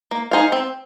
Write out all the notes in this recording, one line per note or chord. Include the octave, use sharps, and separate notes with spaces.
A#3
D#4 G#4 C5 F5
C4